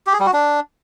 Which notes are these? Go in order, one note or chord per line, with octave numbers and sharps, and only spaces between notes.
G4
G#4
G3
F#4
D4